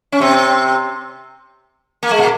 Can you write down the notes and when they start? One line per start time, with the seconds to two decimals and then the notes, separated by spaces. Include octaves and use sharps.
0.12 C#4
0.20 C3 C4
2.03 A#3
2.11 G#3
2.19 A#2 A#3